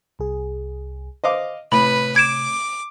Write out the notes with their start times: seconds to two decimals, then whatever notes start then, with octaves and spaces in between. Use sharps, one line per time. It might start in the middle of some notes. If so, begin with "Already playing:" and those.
0.19 C2 G#4
1.24 C5 D#5 F5 D6
1.72 A2 C3 B4 B5
2.16 D6 G#6 D7 E7